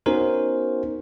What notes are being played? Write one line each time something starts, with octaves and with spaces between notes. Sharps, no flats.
B3 C#4 D#4 F#4 A#4 C5